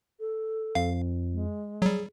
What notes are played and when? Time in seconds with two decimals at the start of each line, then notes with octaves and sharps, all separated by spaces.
0.20 A4
0.75 F2 F5
1.33 G#3
1.82 F#3 G3 G#4